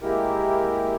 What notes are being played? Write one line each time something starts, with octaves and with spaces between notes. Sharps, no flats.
G#3 A#3 E4 G4 A#4